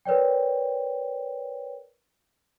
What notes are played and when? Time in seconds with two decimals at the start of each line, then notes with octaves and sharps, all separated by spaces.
0.05 A#4 B4 C#5 D5 G5